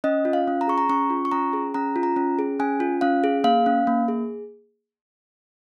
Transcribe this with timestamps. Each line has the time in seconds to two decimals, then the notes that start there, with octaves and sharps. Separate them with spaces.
0.04 C#4 D#5
0.25 F4
0.33 F5
0.48 C#4
0.61 A#5
0.68 G#4 C#6
0.78 A#5
0.89 C#4 C#6
1.10 F4
1.25 C#6
1.32 C#4 A#5
1.53 G#4
1.74 C#4 A#5
1.96 F4
2.03 A#5
2.16 C#4
2.39 G#4
2.60 C#4 G#5
2.80 F4
3.01 C#4 F5
3.24 G#4
3.44 A#3 F5
3.66 C#4
3.87 A#3
4.08 G#4